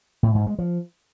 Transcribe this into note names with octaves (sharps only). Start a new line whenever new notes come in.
A2
G#2
G#3
F3